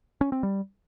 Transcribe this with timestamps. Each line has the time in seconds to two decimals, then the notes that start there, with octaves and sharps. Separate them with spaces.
0.21 C#4
0.32 C4
0.43 G3